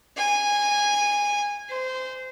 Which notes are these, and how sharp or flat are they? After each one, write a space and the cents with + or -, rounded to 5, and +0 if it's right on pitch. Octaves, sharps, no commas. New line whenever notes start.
G#5 -15
C5 -20